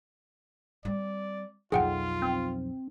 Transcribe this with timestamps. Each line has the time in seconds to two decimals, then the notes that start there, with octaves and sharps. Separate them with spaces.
0.85 G3 C4 D5
1.72 B1 F2 F4 G#4 F#5 G5
2.22 C4